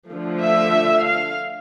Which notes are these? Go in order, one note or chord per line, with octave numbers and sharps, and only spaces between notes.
D3 F3 A3
E5
F5